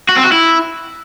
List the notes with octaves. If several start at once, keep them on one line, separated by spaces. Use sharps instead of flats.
F#4
C4
F#4
E4